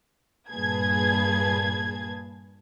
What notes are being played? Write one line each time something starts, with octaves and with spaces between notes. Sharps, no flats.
G2 A#2 G#4 B4 A5 G#6